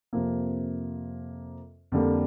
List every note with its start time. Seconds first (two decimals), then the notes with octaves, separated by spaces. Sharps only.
0.13 F2 C3 F3 A#3
1.92 F2 D3 G3 A#3